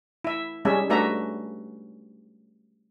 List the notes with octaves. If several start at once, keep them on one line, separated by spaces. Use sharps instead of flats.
E4 E5
G3 G#3 C#4 E5
A3 D4 F#4 B4 E5 A#5